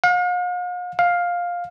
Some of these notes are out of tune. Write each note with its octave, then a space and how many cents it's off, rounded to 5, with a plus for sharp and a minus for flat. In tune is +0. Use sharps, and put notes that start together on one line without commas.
F5 +45
F5 +10